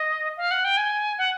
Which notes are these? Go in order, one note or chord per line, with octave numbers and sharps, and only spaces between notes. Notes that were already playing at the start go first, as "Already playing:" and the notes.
Already playing: D#5
F5
F#5
G5
G#5
F#5